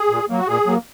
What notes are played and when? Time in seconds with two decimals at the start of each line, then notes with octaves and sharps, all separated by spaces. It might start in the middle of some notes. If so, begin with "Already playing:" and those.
Already playing: G#4
0.10 A#2
0.30 F#3 A#3
0.38 F#4
0.48 A#2 G#4
0.66 F#3 A#3